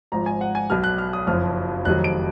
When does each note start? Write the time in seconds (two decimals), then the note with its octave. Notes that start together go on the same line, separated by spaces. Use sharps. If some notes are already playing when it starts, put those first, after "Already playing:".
0.12 G#1 G#2 F3 A#5
0.26 G#5
0.41 F#5
0.55 G#5
0.70 B1 B2 F#3 F6
0.84 F#6
0.98 F6
1.13 D#6
1.27 F#1 F2 F3 F6
1.85 F1 F2 D#3 F#3 F#6
2.04 D7